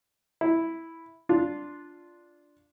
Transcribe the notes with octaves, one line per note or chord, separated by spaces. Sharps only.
E4
D4 F4